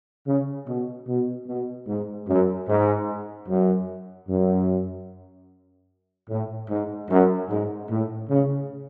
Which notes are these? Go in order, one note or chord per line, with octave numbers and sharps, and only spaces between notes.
C#3
B2
B2
B2
G#2
F#2
G#2
F#2
F#2
A2
G#2
F#2
G#2
A2
C#3